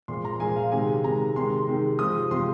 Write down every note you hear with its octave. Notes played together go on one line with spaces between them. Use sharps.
A#2 F3 G#3 C6
A#5
A#2 F3 G#3 G#5
F5
C3 D#3 G#3 G#5
C3 D#3 G#3 A#5
C3 D#3 G#3 C6
C3 D#3 G#3
C3 F3 G#3 D#6
C3 F3 G#3 C6